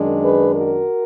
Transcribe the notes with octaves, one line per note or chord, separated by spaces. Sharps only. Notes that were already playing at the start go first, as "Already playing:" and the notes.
Already playing: F#2 D#3 G#3 D4
G#4 B4
F#4 A#4